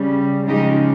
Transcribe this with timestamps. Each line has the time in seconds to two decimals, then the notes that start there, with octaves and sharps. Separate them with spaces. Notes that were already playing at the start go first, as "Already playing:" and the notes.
Already playing: C#3 G3
0.47 C#3 F3 G#3 D#4 G4